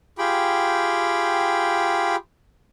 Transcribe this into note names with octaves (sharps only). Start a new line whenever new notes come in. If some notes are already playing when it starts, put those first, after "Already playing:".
F4 G4 G#4 G5 B5